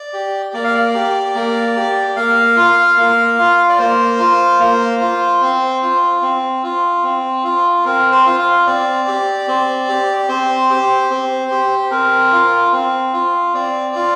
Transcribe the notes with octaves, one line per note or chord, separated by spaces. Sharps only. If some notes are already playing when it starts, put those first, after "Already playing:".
Already playing: D5
G4
A#3 D5
F5
D5
G4
A#3
G4
A#3 F5
F4
A#3
F4
D5
A#3 C5
F4
A#3
F4
C4
F4
C4
F4
C4
F4
C4 A#4
C5
F4
F5
C4 D5
G4
C4
G4
C4 C5
G4
C4
G4
C4 A#4
F4
C4
F4
C4 D5
F4